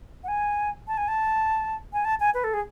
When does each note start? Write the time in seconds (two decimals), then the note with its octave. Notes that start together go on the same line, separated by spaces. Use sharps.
0.24 F#5
0.28 G#5
0.88 A5
0.98 G#5
1.08 A5
1.93 G#5
2.05 A5
2.20 G#5
2.34 B4
2.44 A4
2.54 G#4